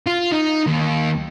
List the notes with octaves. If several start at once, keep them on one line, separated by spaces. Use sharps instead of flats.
F4
D#4
D#2